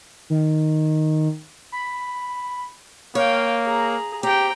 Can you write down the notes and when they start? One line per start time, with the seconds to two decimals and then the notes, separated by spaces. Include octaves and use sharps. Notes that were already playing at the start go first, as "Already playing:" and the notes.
0.30 D#3
1.72 B5
3.15 A#3 C#5 F5 G5
3.64 G#4 A#5
4.23 C4 G4 G5 A#5